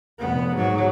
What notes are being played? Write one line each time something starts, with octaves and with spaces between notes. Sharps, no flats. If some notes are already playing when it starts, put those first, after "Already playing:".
F1 B3
G#2 F#3